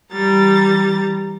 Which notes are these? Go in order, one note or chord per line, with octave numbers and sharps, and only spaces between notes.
E3 G3 A#5 A6